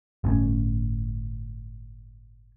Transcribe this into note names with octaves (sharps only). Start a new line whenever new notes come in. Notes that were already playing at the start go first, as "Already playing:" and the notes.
G1 A2 C4 C#4